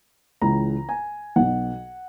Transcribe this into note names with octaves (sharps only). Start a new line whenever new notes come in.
C#2 C#3 E3 A#5
G#5
B1 B2 F#5